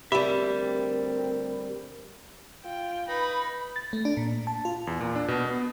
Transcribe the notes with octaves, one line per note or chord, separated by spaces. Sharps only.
D2 G3 C4 G4 A#4 E5 B5
F4 G5
D#4 B4 B5
A6
A3
D4
A#2
A5
F4
E2
A#2
D4
B2
B3